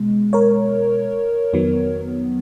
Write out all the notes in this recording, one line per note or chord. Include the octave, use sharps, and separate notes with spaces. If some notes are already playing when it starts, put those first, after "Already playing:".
Already playing: B2 G#3
A#4 C#5
F2 D#3 F#3 B3